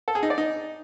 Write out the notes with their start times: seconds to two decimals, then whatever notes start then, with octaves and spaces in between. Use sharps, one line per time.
0.08 A4
0.15 G#4
0.23 D#4
0.30 D5
0.38 D#4